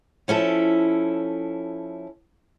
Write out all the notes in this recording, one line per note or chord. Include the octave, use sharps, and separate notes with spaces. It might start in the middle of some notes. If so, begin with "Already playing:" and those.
F3 C#4 E4 A4